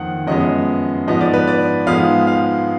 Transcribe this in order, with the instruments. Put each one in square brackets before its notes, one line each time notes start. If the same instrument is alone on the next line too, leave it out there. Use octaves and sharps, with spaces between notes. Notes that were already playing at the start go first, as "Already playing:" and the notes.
Already playing: [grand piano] F2 D#3 A#3 F#5
F#2 F3 G#3 B3 D#5
G#2 F3 B3 D#5
D5
B4
D5
G#2 F3 G#3 B3 F5
F5